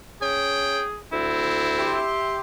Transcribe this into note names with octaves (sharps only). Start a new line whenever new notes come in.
C#4 G#4 G5
D2 C4 E4
G4 E5 C6